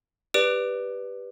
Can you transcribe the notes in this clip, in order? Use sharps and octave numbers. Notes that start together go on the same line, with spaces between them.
G4 B4 D5 D7 F7